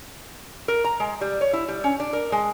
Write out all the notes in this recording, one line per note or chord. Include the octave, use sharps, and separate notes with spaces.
A#4
A#5
G#3
G3
C#5
E4
G3
C#4
D4
A#4
G#3